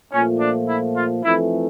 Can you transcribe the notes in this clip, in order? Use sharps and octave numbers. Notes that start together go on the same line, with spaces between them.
A#2 F3 A3 C#4
D4
E4
F4
F2 E3 A3 E4